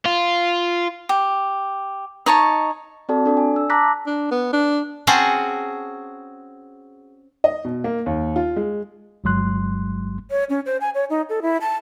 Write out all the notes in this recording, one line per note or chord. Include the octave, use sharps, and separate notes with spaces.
F4
G4
D#4 C#5 A5 C#6
C4 F#4 A4 D5 A5
D4 A4 D5
G#5
E6
A5 A#5 D6 F#6 A#6 B6
D4
B3
D4
C4 C#4 F#4 G#4 F#5 A5
D#5
B2
A#3
D#2
F4
G#3
G1 G2 F#3 G#3 C6 F#6
C#5
C#4
C5
G#5
C#5
D#4
A4
E4
A5